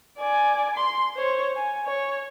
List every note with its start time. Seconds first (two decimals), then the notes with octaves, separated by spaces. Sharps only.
0.18 D5 G#5
0.76 C6
1.16 C5 C#5
1.56 G#5
1.86 C#5